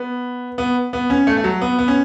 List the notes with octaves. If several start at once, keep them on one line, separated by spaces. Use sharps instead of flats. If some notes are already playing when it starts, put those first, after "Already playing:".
Already playing: B3
B3
B3
C#4
A3
A3
F#3
B3
B3
C#4